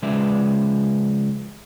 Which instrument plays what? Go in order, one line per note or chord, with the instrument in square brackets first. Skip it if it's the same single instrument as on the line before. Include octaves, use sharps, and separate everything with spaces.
[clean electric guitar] C#3 F3 G#3 B4 D5 E5